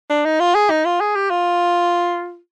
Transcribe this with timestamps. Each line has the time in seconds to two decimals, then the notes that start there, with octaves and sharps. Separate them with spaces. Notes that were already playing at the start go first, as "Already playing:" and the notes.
0.10 D4
0.25 D#4
0.40 F4
0.55 G#4
0.70 D#4
0.85 F4
1.00 G#4
1.15 G4
1.30 F4